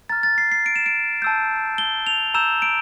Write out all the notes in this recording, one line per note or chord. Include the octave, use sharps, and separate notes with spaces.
A#5 F6 A6
A6
C7
C7
D7
E7
D7
A5 E6 G6
G7
F7
A#5 E6 G6 E7
D7